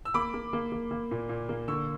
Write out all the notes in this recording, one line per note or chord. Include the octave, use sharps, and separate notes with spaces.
E6
A#3 B5 D6
A#3
A#3
A#3
A#3
A#2
A#2
A#3
D3 C#6 E6